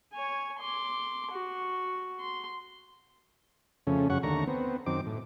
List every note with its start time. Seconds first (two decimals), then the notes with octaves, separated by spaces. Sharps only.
0.13 C#5 G#5
0.59 C6 D6
1.32 F#4
2.20 C6
3.87 F2 C#3 A3 C#4
4.10 F#2 C#3 C#4 F#5 C#6
4.23 D#2 D3 A3 A#5 C#6
4.47 B3 C4
4.86 F#2 D#3 C4 D6
5.07 A2